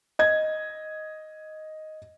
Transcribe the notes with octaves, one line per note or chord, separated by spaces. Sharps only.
D#5 G#6